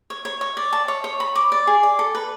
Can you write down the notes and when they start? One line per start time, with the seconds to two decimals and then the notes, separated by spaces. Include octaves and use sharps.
0.10 C#5
0.25 C#5
0.41 C#5
0.57 D5
0.73 A5
0.88 C#5
1.04 C#5
1.20 B5
1.35 D6
1.52 D5
1.67 G#4
1.83 D5
1.99 A4
2.15 B4